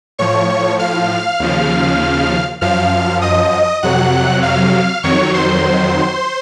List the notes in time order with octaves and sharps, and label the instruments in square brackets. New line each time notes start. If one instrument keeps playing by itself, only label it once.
[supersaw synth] A2 F3 C#5 C#6
F5 F6
D#2 C#3 F3
F#2 F3 F5 F6
D#5 D#6
F2 C3 F#3 F#5 F#6
F5 F6
F2 D#3 F#3 C#5 C#6
C5 C6